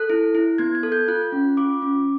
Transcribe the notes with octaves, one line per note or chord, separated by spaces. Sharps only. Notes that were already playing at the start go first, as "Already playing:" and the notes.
Already playing: A4 F#6
E4
E4
B3 G#6
G#6
A4
G6
F4 F#6
C#4
F4 D6
C#4